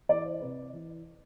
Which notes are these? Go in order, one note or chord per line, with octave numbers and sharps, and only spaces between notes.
E3 D5
C5
C3 B4
E3